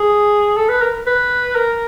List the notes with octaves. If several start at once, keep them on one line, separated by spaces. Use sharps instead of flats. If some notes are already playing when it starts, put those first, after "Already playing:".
Already playing: G#4
A4
B4
A#4
B4
A#4